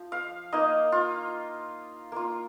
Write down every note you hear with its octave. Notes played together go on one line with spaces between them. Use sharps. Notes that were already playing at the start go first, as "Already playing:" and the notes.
Already playing: F3
F5
A#3 D#4 D#5
F4
A#3 F4